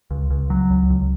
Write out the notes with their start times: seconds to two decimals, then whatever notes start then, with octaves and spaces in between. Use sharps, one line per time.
0.11 C#2
0.31 C#2
0.50 F#3
0.70 C#2
0.90 C#2